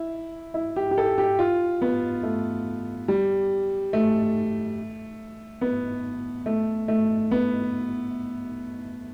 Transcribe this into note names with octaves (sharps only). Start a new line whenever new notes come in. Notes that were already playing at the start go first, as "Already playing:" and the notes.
Already playing: E4
E4
G4
G4
A4
G4
F4
B3
A3
G3
A3
B3
A3
A3
B3